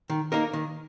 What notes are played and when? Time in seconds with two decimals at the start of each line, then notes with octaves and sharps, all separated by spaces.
0.10 D#3
0.32 A#3 D#4 A#4
0.53 D#3